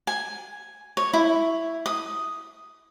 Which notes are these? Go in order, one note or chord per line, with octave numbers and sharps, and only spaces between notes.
G#5
C#5
E4
D#6